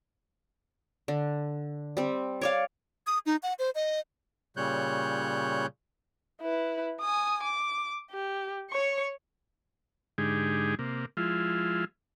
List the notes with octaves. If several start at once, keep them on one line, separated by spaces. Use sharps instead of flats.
D3
G3 C4
C#5 D5 F5
D#6
D#4
F#5
C5
D#5
A#2 C#3 G3 C#5 F#6 G6
E4 B4
G#5 D#6
D6
G4
C#5 C#6
G#2 D3 G#3 D#4 G4 G#4
C3 A#3
F3 G#3 E4 F4